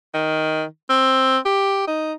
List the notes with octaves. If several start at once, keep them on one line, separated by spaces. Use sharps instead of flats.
D#3
C4
G4
D#4